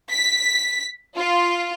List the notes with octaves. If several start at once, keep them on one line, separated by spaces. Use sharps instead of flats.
B6
F4